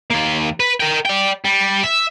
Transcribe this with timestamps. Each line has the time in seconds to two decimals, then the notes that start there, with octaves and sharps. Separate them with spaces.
0.11 D#2 A#3
0.60 B4
0.80 A#4 G5
1.05 D5 G5
1.45 G3
1.83 E5